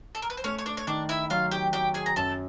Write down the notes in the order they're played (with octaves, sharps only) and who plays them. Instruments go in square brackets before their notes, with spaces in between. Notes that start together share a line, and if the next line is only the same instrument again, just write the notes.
[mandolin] A4
A#4
B4
C5
[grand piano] A3 [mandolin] C#4 C#5
[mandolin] C#5
D4 D5
C#5
[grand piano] D#3 [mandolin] D4 D5
[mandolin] E4 E5
[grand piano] F#3 [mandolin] F4 F5
[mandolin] G4 G5
[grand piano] F#3 [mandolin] G4 G5
[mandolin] G#4 G#5
A#5
[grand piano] F#2 [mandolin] A4 A5